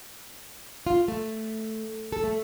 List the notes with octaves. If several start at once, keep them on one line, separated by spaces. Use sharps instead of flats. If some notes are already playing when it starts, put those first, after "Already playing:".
F4
A3
A4
A3